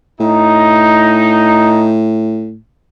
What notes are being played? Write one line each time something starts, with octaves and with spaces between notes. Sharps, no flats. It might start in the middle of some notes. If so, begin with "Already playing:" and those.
A2 D#4